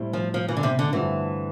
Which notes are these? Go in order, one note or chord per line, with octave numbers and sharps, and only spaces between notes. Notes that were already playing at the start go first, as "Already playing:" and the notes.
Already playing: A2 G3 C4 E4
F3
F3
E3
D3
C3
D3
G2 D3 E3 A3 C4 F4